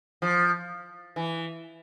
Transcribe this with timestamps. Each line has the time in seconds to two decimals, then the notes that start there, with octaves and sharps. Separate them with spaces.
0.22 F3
1.16 E3